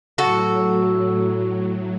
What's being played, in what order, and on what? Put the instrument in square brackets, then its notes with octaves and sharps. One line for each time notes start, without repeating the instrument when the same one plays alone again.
[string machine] A2 F#3 [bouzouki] F#4 A4